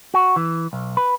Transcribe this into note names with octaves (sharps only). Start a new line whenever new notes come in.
F#4
E3
B1
B4